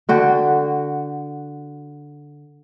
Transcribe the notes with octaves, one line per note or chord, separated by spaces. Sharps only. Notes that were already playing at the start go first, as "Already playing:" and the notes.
D3 F#4 G5